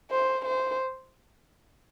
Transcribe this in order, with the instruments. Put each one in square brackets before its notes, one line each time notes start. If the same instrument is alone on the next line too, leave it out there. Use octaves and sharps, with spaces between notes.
[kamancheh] C5
C5